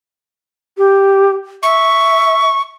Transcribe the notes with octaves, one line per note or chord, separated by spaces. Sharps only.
G4
E5 C#6